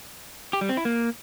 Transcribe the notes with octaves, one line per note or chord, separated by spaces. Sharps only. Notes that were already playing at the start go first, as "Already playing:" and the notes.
G4
G3
C4
E4
A#3